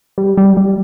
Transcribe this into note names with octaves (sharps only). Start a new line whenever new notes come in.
G3
G3
G3